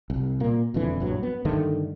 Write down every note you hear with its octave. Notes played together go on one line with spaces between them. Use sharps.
C2
A#2 A#3
E1 F2 D3 E3
A#1 G2 F#3
B3
G2 D3 D#3 A3